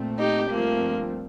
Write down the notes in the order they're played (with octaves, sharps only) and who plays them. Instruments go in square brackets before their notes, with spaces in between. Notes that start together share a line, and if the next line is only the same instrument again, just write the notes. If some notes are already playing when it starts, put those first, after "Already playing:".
Already playing: [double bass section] A#2 A3 C4
[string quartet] D#4 G4
[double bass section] G2 F3 A3 C4 [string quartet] A#3